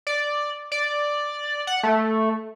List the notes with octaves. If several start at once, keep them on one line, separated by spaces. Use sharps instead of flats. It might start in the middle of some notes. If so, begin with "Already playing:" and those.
D5
D5
F#5
A3